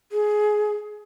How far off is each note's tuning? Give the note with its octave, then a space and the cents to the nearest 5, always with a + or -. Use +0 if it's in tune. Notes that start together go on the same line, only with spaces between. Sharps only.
G#4 +15